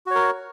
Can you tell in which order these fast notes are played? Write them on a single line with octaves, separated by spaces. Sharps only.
F#4 C#5 A#4